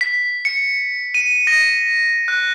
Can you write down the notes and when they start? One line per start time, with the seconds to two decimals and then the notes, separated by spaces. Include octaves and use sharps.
0.01 B6
0.45 C#7
1.14 D#7
1.47 A#6
2.28 F#6